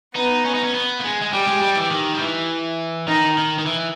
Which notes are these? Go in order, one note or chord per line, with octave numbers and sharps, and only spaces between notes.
B3 D#4
C#4
D#4
C#4
B3
A#3
G#3
G#3
G3 G4
G#3
G3
E3
D#3
G3
E3
D#3 D#4
D#3
D#3
E3